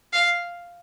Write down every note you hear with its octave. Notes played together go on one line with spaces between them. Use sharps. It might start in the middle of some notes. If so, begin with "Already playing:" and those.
F5